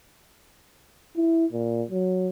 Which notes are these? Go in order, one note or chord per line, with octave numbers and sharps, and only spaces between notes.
E4
A#2
F#3